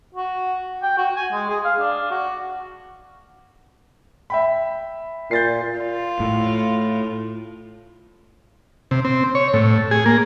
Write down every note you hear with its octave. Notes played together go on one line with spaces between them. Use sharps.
F#4
G5
F#4
G#5
G#3
G#4
F5
D4
F#4
E5 G5 B5
A#2 G6 A6 C7
F4
A2
C3
C4
C#5
A2
G#4
A#3